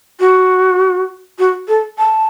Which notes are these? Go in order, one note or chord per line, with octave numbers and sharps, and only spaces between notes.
F#4
F#4
A4
A5